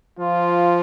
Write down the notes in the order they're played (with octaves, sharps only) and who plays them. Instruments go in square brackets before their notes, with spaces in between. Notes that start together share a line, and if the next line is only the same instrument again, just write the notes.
[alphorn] F3 [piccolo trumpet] F4